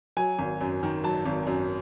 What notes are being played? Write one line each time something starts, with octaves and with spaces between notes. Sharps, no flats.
F#3 G#5
G#1
F#2
D#3
F#3 A5
G#1
F#2